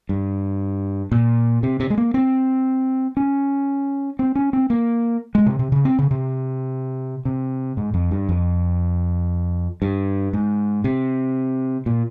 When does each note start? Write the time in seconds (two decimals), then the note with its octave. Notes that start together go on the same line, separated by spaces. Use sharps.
0.09 G2
1.12 A#2
1.63 C3
1.80 C3
1.90 G#3
1.98 A#3
2.14 C4
3.17 C#4
4.19 C4
4.35 C#4
4.53 C4
4.70 A#3
5.35 G#3
5.46 C3
5.59 C3
5.72 C#3
5.85 C4
5.99 C#3
6.11 C3
7.25 C3
7.77 G#2
7.94 F2
8.11 G2
8.29 F2
9.82 G2
10.33 G#2
10.84 C3
11.86 A#2